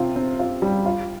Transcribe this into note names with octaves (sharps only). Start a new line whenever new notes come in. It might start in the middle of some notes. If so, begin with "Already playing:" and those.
Already playing: C3 C4 F4
C4
F4
G3
F4